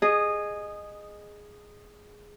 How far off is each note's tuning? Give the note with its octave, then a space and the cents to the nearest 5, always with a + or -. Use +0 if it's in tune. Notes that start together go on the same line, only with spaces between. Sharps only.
G#4 +0 D#5 -15